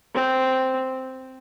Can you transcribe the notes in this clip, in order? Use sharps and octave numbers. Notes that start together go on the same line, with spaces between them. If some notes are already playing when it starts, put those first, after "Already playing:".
C4